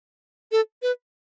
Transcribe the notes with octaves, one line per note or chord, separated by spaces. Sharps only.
A4
B4